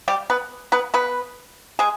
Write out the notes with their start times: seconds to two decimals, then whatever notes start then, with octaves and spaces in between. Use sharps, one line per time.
0.08 G3 G4
0.30 B3 B4
0.72 B3 B4
0.94 B3 B4
1.79 G#3 G#4